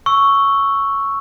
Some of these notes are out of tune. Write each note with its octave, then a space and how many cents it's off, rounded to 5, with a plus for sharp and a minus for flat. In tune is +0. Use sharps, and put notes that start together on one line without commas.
C#6 +0 E6 +0